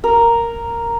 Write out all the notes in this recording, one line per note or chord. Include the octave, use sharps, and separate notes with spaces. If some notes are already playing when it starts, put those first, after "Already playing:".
A#4